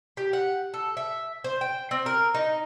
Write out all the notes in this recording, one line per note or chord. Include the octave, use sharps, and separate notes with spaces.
G4
F#5
A4
E5
C5
G5
C4
A#4
D#4